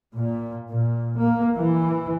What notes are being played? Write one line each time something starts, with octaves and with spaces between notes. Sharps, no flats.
A#2
A#2
A#3
E3